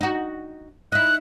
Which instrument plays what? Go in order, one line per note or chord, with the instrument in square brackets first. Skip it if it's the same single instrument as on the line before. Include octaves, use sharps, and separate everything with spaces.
[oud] D#4 F#4
[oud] D#4 E4 [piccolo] F#6